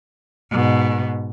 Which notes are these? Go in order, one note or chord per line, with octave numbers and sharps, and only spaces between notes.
G#2 B2